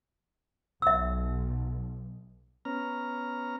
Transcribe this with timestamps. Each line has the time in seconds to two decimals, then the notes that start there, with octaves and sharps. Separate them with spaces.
0.82 B1 E5 E6
2.65 B3 C#4 A#5 F6